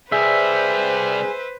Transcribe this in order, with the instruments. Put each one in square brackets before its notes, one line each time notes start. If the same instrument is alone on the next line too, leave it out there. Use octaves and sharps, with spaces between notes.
[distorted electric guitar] C2 G3 [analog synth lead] G#4 [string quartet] B4 C5 [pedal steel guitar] E5